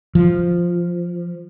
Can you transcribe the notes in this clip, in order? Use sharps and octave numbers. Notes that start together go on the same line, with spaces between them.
F3